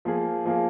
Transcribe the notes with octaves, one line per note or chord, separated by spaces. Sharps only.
F3 A#3 G#4
F3 A#3 G#4